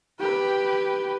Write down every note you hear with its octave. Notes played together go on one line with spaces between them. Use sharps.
G4 B4